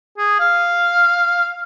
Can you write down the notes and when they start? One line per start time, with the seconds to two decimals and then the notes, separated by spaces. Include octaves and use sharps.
0.18 G#4
0.40 F5